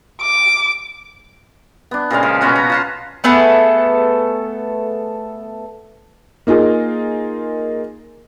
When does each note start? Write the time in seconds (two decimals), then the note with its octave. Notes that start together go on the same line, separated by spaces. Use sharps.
0.22 D6
1.91 B3 D4
2.10 A#2 C#3 G#3 F5
2.23 F3
2.41 B2 B3 C#4 F#4
2.55 A#5
2.70 F4 A5 C6
3.24 A3 B3 G#4 A4
6.47 A#3 D#4 F4 G#4 A#4